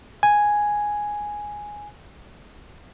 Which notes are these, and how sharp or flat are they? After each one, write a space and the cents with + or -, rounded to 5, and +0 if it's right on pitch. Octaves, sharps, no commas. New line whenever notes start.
G#5 +0